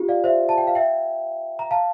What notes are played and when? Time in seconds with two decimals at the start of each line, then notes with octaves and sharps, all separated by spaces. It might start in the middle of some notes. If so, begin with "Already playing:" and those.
Already playing: F4 G4
0.08 D5 F5
0.24 C5 E5
0.49 A5
0.58 G5
0.67 F5
0.75 E5 G5
1.59 A#5
1.71 F5 A5